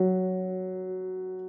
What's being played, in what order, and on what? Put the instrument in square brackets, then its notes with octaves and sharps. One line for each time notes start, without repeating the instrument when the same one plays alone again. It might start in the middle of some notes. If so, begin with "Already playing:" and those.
Already playing: [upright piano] F#3